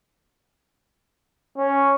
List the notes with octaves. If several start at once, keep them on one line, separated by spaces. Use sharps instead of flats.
C#4